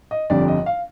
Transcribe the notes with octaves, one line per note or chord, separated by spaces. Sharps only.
D#5
G1 F2 D3 G3 D5
D#5
F5